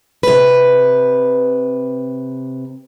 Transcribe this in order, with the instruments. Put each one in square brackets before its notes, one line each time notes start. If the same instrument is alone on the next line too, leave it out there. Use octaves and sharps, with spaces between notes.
[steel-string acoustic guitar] C3 B4